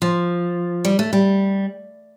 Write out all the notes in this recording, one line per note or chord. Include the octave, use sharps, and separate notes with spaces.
F3
G3
A3
G3